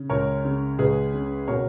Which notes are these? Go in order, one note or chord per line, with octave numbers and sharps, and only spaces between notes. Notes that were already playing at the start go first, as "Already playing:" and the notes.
Already playing: C#3
C#2 A#4 C#5
C#3
C#2 G#4 B4
C#3
B2 A#4 C#5